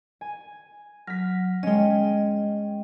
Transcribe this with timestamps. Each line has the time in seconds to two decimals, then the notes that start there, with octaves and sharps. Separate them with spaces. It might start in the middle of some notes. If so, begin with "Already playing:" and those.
0.21 G#5
1.07 F#3 F6 B6
1.63 G#3 C#4 D#5 G5